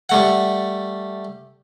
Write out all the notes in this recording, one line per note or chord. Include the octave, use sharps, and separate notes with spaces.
G3 A3 F#5